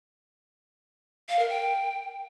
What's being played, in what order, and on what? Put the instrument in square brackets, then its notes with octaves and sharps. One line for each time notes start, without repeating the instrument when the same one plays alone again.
[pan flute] F5
A#4
G5